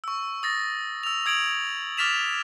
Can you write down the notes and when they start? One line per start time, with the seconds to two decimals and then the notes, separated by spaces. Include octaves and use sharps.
0.04 C#6 E6
0.43 D#6 A6 A#6
1.03 E6 F7
1.26 D#6 G#6 D7 F7 F#7
1.97 D6 F6 A6 B6 E7 F7